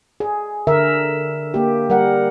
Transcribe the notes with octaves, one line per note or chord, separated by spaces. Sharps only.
G#4
D3 A#4 E5
A#3 G4
G3 A#4 F#5